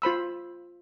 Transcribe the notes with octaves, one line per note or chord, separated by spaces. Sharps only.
F4 C5 B5 E6